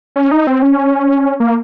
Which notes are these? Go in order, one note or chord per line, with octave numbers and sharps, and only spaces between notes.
C#4
D#4
C4
C#4
A#3